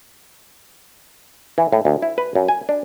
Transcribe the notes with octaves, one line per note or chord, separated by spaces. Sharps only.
E3
A2
D2
E4
B4
F#2
G#5
D4